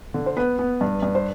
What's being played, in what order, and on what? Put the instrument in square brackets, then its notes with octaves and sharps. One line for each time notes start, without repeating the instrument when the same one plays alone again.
[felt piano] D3
C5
B3 B4
B3
G2
G2
C5